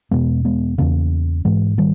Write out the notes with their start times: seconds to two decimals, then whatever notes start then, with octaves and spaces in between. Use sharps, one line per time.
0.11 E2 B2 G#3 B3
0.45 G#3 B3
0.78 E2 C#3 A#3 C#4
1.45 G#2 E3 G#3
1.78 D#3 G3